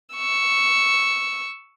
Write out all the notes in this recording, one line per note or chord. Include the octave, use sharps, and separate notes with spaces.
C#6 E6